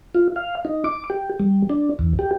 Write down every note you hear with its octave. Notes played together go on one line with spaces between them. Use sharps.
F4
F5
D#4
D6
G4
G3
D4
E2
G4